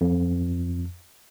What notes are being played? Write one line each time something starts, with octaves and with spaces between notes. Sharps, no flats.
F2